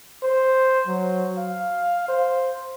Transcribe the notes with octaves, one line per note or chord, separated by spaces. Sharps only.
C5
F#3
F5
C5